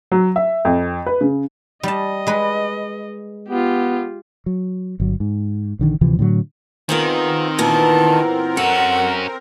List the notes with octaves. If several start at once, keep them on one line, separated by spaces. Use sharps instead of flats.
F#3
E5
F2
B4
C#3
G3 D#5 A5
G#3 B4
B3 F4 G4
F#3
G1 F#3
G#2
A#1 D3 D#3
D2 C3 E3 F3
A2 D3 F#3
D#3 B3 C4 F4 G#4 A#4
A#2 E3 B3 A5
C#4 F#4 A4 F#5